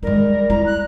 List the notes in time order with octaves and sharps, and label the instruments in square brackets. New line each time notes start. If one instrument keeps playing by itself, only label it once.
[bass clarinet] G3 [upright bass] G#3 D#4 [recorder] A#4
[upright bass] E4 [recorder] A#5
[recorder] F#6